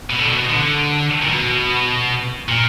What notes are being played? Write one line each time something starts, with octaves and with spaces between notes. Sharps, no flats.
B2
D3
B2
D3
A#2
B2
A#2